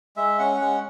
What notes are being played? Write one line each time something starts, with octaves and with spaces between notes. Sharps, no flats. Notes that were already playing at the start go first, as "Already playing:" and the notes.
G#3 E5
C#4 F#5
G#3 F#5